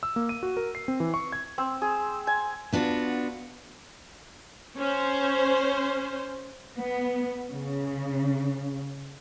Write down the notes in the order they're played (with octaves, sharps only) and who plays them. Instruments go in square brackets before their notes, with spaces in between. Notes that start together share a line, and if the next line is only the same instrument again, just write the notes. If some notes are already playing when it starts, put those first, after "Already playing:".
[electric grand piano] E6
A#3
D#7
F#4
A#4
C7
C4
E3
C#6
G#6
[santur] C4
G#4
G#5
[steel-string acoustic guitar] B3 D4 F4 F#4
[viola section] C#4 C5
[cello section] B3
C#3